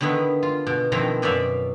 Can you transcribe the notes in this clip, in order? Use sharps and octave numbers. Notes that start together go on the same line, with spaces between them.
D3 D#3 B3 E4
F4
B2
B2 D#3 F3 C4 E4 A#4
F#2 B2 F#3 D5 E5 F5